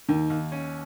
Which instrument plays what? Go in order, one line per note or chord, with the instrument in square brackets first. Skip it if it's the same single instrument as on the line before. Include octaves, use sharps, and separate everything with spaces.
[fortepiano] D#2 [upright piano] D#3
[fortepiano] D#2
C#4